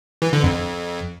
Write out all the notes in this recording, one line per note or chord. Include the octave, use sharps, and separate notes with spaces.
E3
D3
F2